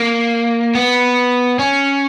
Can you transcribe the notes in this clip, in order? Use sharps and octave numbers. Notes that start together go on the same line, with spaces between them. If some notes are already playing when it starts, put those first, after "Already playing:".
Already playing: A#3
B3
C#4